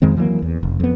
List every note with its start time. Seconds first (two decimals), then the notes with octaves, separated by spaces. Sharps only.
0.02 F2 D#3 G#3 C4
0.17 E3 F#3 G#3 A#3
0.42 E2
0.63 F1
0.80 F2 B3